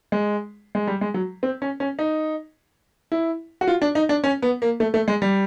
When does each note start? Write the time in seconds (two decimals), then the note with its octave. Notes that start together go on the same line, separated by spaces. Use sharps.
0.12 G#3
0.75 G#3
0.87 G3
1.01 G#3
1.14 F#3
1.43 C4
1.62 C#4
1.80 C#4
1.99 D#4
3.12 E4
3.61 F#4
3.67 F4
3.82 D4
3.95 D#4
4.09 D4
4.24 C#4
4.42 B3
4.62 A#3
4.80 A3
4.94 A3
5.08 G#3
5.22 G3